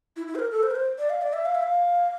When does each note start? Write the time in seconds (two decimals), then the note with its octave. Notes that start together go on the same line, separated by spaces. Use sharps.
0.16 E4
0.27 E4
0.35 C5
0.39 A#4
0.51 A4
0.63 C5
0.71 A#4
0.75 C5
0.98 D5
1.09 F5
1.22 D5
1.33 E5
1.45 F5
1.55 E5
1.62 F5